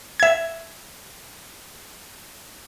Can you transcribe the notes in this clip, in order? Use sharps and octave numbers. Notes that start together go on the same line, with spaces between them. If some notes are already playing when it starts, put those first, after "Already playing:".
E5 G#6